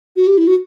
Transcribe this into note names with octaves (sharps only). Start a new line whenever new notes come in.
F#4
G4
E4
F#4